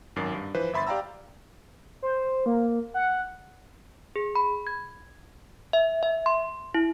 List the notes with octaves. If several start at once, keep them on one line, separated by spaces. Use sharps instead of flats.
G#1 F#2 D#3 D6 A6 C7
G2
E3 F3 B4 C5
G1 E5 B5 C6 A6
G4 D5 F5 G5 A#5 E6
C5
A#3
F#5
G#4
B5
G#6
E5
E5
C6
E4